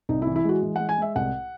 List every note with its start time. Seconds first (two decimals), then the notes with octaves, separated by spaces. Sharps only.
0.09 C2 D#4
0.22 E4
0.27 E3
0.36 E4
0.44 G#3 F#4
0.62 E3
0.76 G#3 F#5
0.89 G#5
0.98 G#3 E5
1.16 C2 F#5